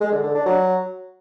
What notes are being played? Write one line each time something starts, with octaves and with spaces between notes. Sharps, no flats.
G#3
D3
D3
D4
F#3